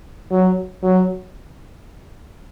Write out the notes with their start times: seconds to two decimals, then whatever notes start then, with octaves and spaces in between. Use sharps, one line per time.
0.31 F#3
0.83 F#3